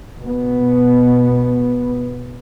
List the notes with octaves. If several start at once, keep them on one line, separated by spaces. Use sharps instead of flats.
B2 B3